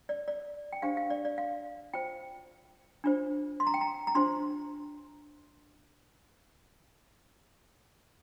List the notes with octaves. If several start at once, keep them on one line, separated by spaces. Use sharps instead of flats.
D5
D5
G5
D4 G4 C5 F5
F5
D5
D5
F5
F4 C5 G5
D4 F4 C5
C6
A#5
G5
A#5
A#5
D4 F4 C5 C6